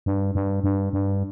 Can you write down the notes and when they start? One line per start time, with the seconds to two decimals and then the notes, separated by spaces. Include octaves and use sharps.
0.06 G2
0.35 G2
0.64 G2
0.93 G2